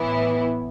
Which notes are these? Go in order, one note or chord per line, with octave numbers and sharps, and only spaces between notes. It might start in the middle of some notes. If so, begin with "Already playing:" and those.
Already playing: A2 E3 B3 E4